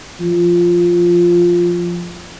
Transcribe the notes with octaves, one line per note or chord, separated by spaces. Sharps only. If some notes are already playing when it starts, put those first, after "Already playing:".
F3